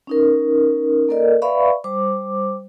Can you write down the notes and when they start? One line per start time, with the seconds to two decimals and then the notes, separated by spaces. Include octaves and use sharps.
0.07 C#4 D#4 A#4
1.09 A#3 A4 A#4 D5 D#5
1.42 B4 D5 E5 F5 B5 C#6
1.84 G3 C5 D6